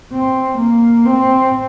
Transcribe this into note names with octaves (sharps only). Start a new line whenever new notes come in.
C4
A#3
C4